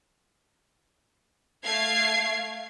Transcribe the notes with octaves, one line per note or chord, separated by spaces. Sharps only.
A3 F5 G#6 C7